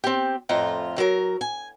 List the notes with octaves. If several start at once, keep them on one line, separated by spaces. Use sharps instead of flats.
C4 G4
F2 A2 F4 A#5
F#3 A#4
G#5